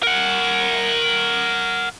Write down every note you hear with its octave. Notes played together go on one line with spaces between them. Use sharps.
A#4 F#5